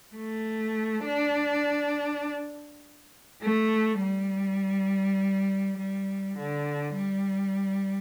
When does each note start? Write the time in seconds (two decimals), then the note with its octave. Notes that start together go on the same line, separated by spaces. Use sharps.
0.16 A3
1.05 D4
3.42 A3
4.01 G3
5.78 G3
6.38 D3
6.96 G3